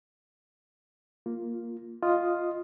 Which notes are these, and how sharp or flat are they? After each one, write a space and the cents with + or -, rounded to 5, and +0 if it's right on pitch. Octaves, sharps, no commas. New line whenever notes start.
A#3 +0 F4 +0
F4 +0 D#5 +0 D#6 +0